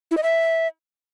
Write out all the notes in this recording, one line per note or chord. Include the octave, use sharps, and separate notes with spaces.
E4
D#5
E5